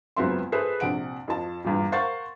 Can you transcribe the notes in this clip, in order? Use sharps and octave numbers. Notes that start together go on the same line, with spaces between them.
C#2 F#2 B3 C4 E5 C6
G#4 A4 B4 C5 E5
A#1 C3 F#5 D7
F2 F3 A5
E2 G2 A#2
A#4 C5 F5 F#5 C#6 A6